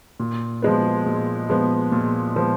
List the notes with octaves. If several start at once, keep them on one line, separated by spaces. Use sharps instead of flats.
A#2
F3 G#3 B3
A#2
F3 G#3 B3
A#2
F3 G#3 B3